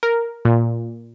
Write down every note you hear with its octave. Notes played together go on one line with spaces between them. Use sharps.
A#4
A#2